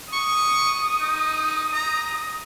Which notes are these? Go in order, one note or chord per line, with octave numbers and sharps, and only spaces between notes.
C#6 D#6
D#4
A#5